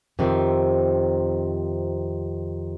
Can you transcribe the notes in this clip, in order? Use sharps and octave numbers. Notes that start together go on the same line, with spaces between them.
F2 C3 D#3